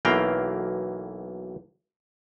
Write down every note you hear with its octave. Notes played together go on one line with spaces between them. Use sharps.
B1 B2 E3 A#3 F5 G5